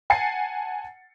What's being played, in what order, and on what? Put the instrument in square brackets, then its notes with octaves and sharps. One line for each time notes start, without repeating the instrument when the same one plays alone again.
[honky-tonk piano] F#5 G#5 A5 A6 C7 C#7